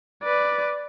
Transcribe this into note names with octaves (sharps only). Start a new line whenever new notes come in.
B4 D5